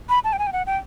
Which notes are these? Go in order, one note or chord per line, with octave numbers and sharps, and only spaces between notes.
B5
A5
G5
G#5
G5
F#5
G5